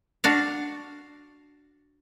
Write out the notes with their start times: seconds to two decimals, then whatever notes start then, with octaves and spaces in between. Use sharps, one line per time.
0.24 D4 F#4 F5